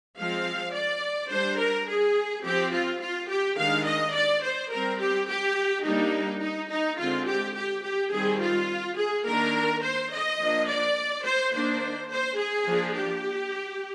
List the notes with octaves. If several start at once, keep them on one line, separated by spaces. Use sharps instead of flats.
F3 G#3 C4 F5
D5
G3 D4 C5
A#4
G#4
F3 C4 G4
F4
F4
G4
D#3 G#3 D4 F5
D#5
D5
C5
G3 C4 A#4
G4
G4
G3 A#3 D4 D#4
D#4
D#4
D3 G#3 C4 F4
G4
G4
G4
D#3 G3 C4 G#4
F4
G#4
D#3 A#3 D4 A#4
C5
D#5
F3 A#3 D4
D5
C5
D#3 A#3 D4 C5
C5
G#4
F3 A#3 D4
G4